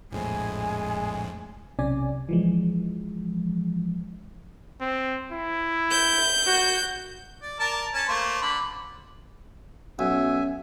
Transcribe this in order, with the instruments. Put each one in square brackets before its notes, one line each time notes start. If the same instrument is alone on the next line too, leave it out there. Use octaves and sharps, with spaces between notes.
[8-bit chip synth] A#1 F2 A2 [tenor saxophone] G#3 [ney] G#5
[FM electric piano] B1 C3 C#4 D5 G#5
E3 F3 G#3
[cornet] C4
E4
[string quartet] G6
[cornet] F#4
[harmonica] D5
A#4 D5 A5
C#4 A5
A3 A#3 C5
D3 B5
[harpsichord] B1 [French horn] C#4 [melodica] E5 G#5